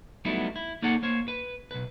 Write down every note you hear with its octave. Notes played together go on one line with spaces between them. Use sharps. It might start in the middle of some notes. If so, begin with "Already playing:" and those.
F#3 G3 A3 B3 D#4 E4
E4
A#3 D#4 G#4 A4 C#5 F#5
A#3 C5 C#5
B4
B1 B4